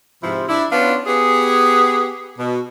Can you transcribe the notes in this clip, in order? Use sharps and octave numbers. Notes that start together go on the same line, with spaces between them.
G#2 C3 F3 C4 E4
D4 E4
B3 C#4 D4 F4
B3 G4 G#4
B2